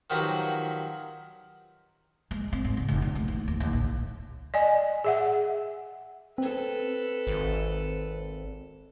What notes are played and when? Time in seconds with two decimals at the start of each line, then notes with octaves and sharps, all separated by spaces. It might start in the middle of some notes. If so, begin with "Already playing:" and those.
0.10 D#3 F3 F#3 G4 B4 A#5
2.31 G#3
2.53 C4
2.65 G#2
2.77 C#3
2.88 F1
3.02 B2
3.15 A3
3.28 D#2
3.48 D#2
3.60 D#2
3.73 A#1
4.54 D5 D#5 G#5
5.04 G#4 E5 F#5
6.38 C4 A4 B4
7.27 G#1